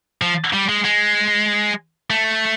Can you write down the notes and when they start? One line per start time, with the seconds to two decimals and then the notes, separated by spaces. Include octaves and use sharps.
0.22 F3
0.53 G3
0.69 G#3
0.84 G#3
2.10 A3